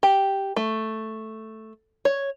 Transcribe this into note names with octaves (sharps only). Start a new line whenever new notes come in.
G4
A3
C#5